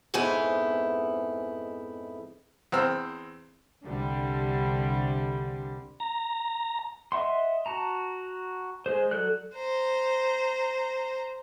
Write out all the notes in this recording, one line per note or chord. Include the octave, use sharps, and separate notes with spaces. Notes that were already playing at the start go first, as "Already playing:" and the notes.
F2 G#2 B3 D#4 E4 G#5
E2 C4 E6 F6
C2 D3 G3
A#5
D#5 E5 F#5 C6
F#4 A5 A#5
G#3 G#4 C5
F#3 A4 D5 F#6
C5 A#5